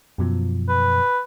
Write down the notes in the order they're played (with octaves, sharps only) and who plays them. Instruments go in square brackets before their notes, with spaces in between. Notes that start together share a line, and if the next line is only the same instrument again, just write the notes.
[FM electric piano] F#2 B2 F3
[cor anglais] B4